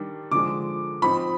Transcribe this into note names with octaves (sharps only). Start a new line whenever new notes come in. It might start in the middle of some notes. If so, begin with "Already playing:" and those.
Already playing: D#3 G3 D4
D3 F3 G#3 D6
F3 C4 D#4 B5